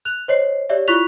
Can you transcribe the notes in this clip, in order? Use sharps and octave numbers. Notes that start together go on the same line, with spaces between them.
F#6 F7
C5 C#5 D#5 C7
G4 C#5 D5 E5
E4 F4 C#6 F#6 B6 F7